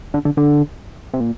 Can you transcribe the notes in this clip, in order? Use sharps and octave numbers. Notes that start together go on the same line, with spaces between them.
D3
D3
D3
C3
A#2